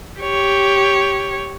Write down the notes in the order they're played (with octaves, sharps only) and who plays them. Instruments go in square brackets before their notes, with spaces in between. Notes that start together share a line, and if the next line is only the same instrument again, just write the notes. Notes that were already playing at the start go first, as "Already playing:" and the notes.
[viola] G4 C#5